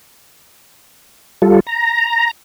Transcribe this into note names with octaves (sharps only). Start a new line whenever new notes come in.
G3 F4 A4
A#5